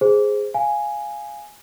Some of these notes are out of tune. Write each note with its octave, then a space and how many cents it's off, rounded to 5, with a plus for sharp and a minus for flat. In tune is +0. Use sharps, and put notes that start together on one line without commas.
G#4 +0 C5 +0
F5 +0 G#5 +0